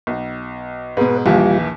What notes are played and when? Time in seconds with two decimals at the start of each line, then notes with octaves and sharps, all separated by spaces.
0.07 B1
0.97 G#2 B2 B4
1.26 A#1 D#2 E3 G3 F4